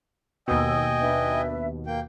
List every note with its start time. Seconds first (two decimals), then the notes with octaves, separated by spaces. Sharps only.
0.48 D#2 B2 D#5 G5 G#5 D#6 E6
1.00 D4 B4 E5
1.87 A#3 G5